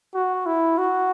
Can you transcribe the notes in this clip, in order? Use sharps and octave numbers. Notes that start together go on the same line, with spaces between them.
F#4
E4
F#4